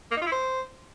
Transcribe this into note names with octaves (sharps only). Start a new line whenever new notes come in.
A#3
D#4
F4
E4
C5